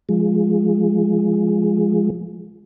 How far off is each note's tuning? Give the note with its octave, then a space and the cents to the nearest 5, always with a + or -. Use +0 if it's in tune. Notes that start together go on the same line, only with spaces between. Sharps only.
F3 +0 G#3 +0